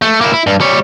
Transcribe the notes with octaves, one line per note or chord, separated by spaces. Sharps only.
A3
A#3 E4
E4
G2
G3 C#5